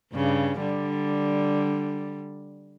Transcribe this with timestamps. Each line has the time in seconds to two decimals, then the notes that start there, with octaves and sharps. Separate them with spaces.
0.13 G2 C#3
0.60 D3 G3